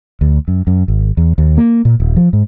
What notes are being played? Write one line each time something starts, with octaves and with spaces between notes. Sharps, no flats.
D2
F#2
F#2
G#1
E2
D#2
A#3
A#2
D#1
F3
G#2